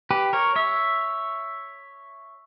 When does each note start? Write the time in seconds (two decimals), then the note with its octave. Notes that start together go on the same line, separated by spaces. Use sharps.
0.11 G4 B4
0.33 A#4 C#5
0.56 C#5 E5